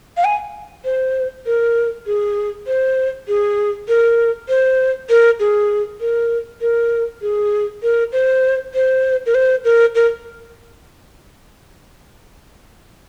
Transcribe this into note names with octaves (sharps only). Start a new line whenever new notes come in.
F5
G#5
C5
A#4
G#4
C5
G#4
A#4
C5
A#4
G#4
A#4
A#4
G#4
A#4
C5
C5
A#4
C5
A#4
A#4